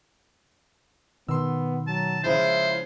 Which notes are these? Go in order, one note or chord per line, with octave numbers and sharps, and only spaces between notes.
B2 D#3 B3 C6 E6
F#3 A5
C#3 F3 G#3 E4 C5